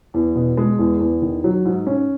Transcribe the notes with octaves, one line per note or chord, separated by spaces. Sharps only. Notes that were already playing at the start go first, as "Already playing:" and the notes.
E2
B2
G#3
E2
E2
D#3
F#3
G#2
C#4